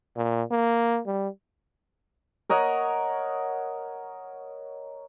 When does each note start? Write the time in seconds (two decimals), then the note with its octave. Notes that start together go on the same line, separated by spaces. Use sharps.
0.17 A#2
0.51 A#3
1.07 G3
2.50 A#4 C#5 D#5 F#5